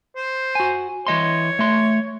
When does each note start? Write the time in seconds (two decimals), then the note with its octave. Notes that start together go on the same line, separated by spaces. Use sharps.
0.16 C5
0.55 F#4 G#5
1.07 E3 C#5 D#5 C6
1.59 A3 C6